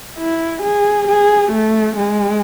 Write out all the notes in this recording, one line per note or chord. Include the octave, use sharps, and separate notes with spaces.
E4
G#4
G#4
A3
G#3